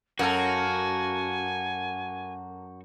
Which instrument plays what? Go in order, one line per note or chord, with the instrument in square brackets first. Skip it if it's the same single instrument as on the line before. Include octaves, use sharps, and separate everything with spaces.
[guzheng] F#2 [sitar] A#3 A4 [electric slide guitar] F#4 [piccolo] G#5